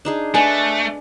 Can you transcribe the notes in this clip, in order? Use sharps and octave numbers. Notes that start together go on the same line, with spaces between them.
D4 D#4 G#4
A3 D4 B4 D#5 G#5